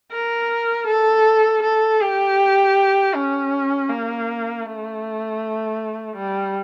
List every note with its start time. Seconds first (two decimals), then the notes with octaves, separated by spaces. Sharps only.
0.11 A#4
0.87 A4
1.63 A4
2.01 G4
3.14 C#4
3.90 A#3
4.66 A3
6.16 G3